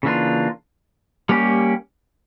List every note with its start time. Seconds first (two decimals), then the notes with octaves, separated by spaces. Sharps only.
0.03 C#3 E3 A#3 D4 F4
1.29 G3 A#3 C#4 G4